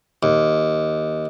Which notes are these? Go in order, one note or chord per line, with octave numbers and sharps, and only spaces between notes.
D#2